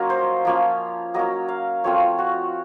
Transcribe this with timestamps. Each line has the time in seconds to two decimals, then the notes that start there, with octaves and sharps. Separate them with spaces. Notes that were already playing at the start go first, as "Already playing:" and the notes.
Already playing: F#3 A#3 C#4 F4 D#5
0.10 C5
0.45 F3 A#3 C#4
1.14 F#3 A#3 C#4 D#5
1.49 F5
1.84 F3 A3 C4 F4 C#5
2.19 F#4